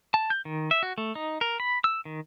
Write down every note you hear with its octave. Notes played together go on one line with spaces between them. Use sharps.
A5
G6
D#3
E5
F#4
A3
D#4
A#4
B5
E6
D#3